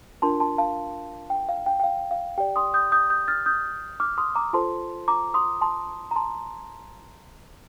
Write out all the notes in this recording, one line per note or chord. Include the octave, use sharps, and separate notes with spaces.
D4 F4 A#4 A5 C6
A5 C6
F5 A5
G5
F5
G5
G5
F5
F5
G4 D5 G5
C6 D#6
D#6 G6
D#6 G6
D#6 G6
F6 A6
D#6 G6
D6 F6
C6 D#6
A#5 D6
F4 A4 C5 A5 C6
A#5 D6
C6 D#6
A5 C6
A#5
A5 C6